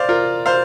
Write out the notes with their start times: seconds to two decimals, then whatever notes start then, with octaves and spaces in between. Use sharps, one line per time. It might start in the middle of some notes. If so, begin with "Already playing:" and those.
Already playing: C5 D5 F5
0.09 F4 A#4
0.46 C5 F5